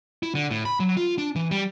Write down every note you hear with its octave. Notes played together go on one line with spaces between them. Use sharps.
E4
D3
A2
B5
F#3
F4
D4
E3
G3